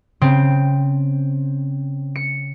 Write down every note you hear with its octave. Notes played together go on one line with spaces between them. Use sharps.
C#3 C4
C#7